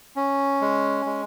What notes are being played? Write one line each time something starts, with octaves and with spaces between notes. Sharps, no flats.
C#4
G#3
G#3